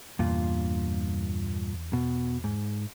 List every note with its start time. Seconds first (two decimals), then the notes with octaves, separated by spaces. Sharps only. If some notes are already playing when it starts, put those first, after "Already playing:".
0.19 E2 G2 A#2 F4
1.93 B2
2.44 G#2